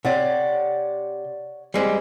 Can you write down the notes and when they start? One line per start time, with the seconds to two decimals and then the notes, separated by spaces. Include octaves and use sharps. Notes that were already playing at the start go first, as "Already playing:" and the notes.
0.05 C3 C#5 D5 F#5
1.74 G3 G#3 C4